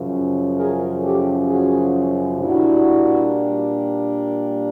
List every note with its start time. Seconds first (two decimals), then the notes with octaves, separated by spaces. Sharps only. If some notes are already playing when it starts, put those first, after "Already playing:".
Already playing: F#2 C#3 F3
0.58 G#4 A#4
1.03 G4 A4
1.48 F#4 G#4
2.39 A#2 G3 A#3 D4 E4 F#4